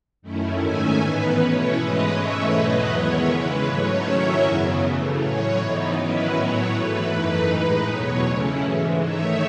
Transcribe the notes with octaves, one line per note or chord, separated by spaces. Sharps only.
F#2 D#3 A3 C#4 E4
G#2 D#3 A3 C#4 E5 G#5
A2 E3 B3 D#4 B4
B2 A3 C#4 E4 C#5
G#2 E3 G#3 B4 D#5
G#2 E3 A3 C#4 E4 C#5 E5
E2 B2 F#3 A3 B4 D#5
E2 D#3 G#3 B3 E4 C#5
C#3 E3 G#3 B4
G#2 F#3 A3 C#4 C#5
D#3 F#3 C#4 E4 C#5 E5
F#2 C#3 F#3 B3
C#3 E3 A3
A2 F#3 C#4 C#5
G#2 E3 B3 D#4
D#3 F#3 C#4 E4 B4
A2 F#3 B3 E4 C#5
G#2 E3 A3 B4
F#2 E3 A3 D#4 B4
A2 G#3 D#4 B4
E2 B2 F#3 C#5
C#3 E3 A3 C#4 E4
G#2 E3 G#3
D#3 A3 D#4 C#5 E5